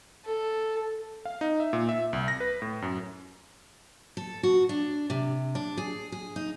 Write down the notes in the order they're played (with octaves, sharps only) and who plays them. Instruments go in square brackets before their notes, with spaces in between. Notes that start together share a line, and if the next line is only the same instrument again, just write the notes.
[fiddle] A4
[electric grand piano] F5
D#4
E5
A#2
E5
C2
A#6
B4
A2
F#2
[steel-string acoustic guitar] A4
F#4
D4
C3
D4
G#4
G#4
D#4